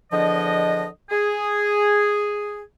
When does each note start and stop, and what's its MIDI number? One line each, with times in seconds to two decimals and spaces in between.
0.12 0.87 40
0.12 0.87 50
0.12 0.87 53
0.12 0.87 62
0.12 0.87 75
1.10 2.62 68